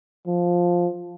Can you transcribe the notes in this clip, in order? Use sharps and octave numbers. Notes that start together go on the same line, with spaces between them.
F3